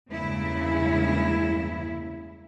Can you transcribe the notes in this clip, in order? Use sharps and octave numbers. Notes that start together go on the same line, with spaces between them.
E2 G2 C#3 G#3 A#3 E4